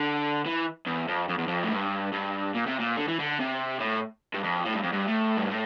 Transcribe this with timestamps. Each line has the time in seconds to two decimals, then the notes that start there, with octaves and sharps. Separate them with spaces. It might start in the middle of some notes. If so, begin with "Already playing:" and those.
Already playing: D3
0.46 E3
0.87 E2
1.08 F2
1.29 F2
1.38 E2
1.48 F2
1.63 A2
1.71 G2
2.13 G2
2.55 A#2
2.67 C3
2.80 A#2
2.97 D3
3.08 E3
3.20 D3
3.40 C3
3.80 A2
4.34 G2
4.44 F2
4.65 A2
4.74 G2
4.83 F2
4.93 G2
5.07 A2
5.37 G2
5.49 A2